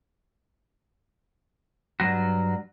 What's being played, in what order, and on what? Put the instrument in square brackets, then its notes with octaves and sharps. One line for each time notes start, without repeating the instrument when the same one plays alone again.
[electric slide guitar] G2 B2 F#3 F#4